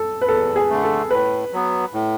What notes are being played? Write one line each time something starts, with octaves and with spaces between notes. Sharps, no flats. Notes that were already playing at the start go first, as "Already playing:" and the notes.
Already playing: A4
B4
E2 A4
G#4
D3 A3
A4
A2 B4
F#3 B3
A2